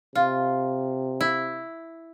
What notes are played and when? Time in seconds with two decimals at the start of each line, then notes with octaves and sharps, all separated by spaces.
0.15 C3 F4
1.21 E4